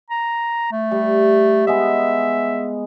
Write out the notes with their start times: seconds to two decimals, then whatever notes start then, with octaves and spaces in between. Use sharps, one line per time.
0.10 A#5
0.72 A3
0.91 G3
1.67 G#3 B3 D#5 E5